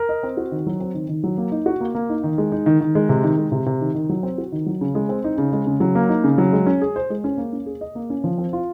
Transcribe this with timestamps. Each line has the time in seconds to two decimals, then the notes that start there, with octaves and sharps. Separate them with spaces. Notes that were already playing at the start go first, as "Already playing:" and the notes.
Already playing: A#4
0.09 D#5
0.23 C4
0.37 F#4
0.51 D#3
0.66 F#3
0.80 C4
0.94 D#3
1.09 D#3
1.24 F#3
1.38 A#3
1.52 D#4
1.66 F#4
1.81 A#3
1.95 A#3
2.09 D#4
2.23 D#3
2.38 G#3
2.52 D#4
2.66 D#3
2.80 D#3
2.95 G#3
3.09 C3
3.24 D#3
3.38 G#3
3.52 C3
3.66 C3
3.81 D#3
3.95 D#3
4.09 F#3
4.23 C4
4.38 F#4
4.52 D#3
4.66 F#3
4.81 C#3
4.95 G#3
5.09 C4
5.24 D#4
5.38 C#3
5.53 G#3
5.67 C#3
5.80 F#3
5.95 A#3
6.09 D#4
6.24 C#3
6.38 F#3
6.52 G#3
6.66 C#4
6.82 G#4
6.96 C5
7.10 G#3
7.24 C#4
7.38 A#3
7.53 C#4
7.66 G#4
7.81 D#5
7.95 A#3
8.10 C#4
8.24 F3
8.38 C4
8.53 F4